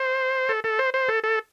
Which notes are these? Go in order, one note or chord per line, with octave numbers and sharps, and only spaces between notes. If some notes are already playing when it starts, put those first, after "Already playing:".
Already playing: C5
A4
A4
C5
C5
A4
A4